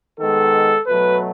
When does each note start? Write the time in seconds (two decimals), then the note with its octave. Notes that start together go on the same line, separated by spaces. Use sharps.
0.20 D#3 G#3 B3 A4
0.87 B2 F#3 A3 B4